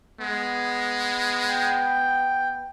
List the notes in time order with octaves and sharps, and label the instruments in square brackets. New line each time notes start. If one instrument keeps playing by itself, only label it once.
[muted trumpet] G#3 [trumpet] B3
[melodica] G5